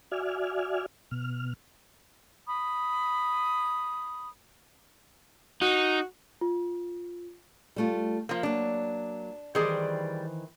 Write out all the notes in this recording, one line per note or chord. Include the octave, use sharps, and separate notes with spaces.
F#4 D5 E5 G#5 F6
B2 F6
B5 D#6
D#4 F#4
F4
G3 A3 F4
F3 A#3
F#3 A#3 D4
D#3 E3 G3 G#4 C5 D5